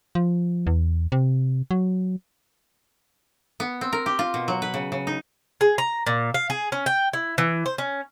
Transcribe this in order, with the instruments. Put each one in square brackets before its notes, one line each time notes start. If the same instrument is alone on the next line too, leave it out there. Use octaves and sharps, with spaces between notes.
[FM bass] F3
E2
C3
F#3
[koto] B3
C4
A#4
G4
F4
B2
F#3
B4
C#3
C#3
D#4
[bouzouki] G#4
A#5
A#2
F5
G#4
C#4
G5
E4
E3
C5
C#4